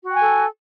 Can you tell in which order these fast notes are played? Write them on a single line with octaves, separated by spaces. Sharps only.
F#4 G5 G#5 A4